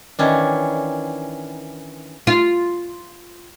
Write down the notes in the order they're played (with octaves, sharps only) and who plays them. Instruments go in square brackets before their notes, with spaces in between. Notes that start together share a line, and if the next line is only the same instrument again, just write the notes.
[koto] D#3 E3 C#4 D4
[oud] F4